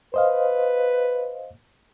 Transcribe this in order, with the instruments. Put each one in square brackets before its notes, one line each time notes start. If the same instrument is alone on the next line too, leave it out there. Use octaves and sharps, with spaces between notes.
[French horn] B4 [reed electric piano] C5 D#5 F5